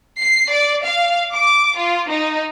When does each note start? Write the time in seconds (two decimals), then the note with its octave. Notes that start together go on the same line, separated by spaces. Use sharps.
0.21 C7
0.51 D5
0.83 F5
1.33 D6
1.77 F4
2.09 D#4